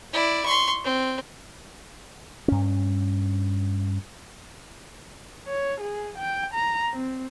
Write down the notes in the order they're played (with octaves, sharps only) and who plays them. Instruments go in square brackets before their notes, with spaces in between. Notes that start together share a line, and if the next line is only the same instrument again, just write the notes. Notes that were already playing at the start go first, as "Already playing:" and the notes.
[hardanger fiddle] E4 D5
C6 C#6
C4
[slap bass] G2 C#4
[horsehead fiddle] C#5
G#4
G5
A#5
C4